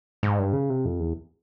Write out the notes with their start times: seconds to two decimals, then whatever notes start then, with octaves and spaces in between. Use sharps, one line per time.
0.23 G#2
0.39 G2
0.53 C#3
0.70 C3
0.85 F2
1.00 E2